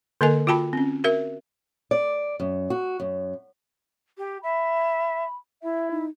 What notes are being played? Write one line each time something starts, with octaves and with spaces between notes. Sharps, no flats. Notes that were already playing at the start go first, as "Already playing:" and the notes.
D3 A#3 A4 A#4 D#5 G#5
F4 F#4 G5 A5 B5
C4 C#4
F#4 A#4 E5
D5
F#2
F#4
F#2
G4
E5 B5
E4 E5
D#4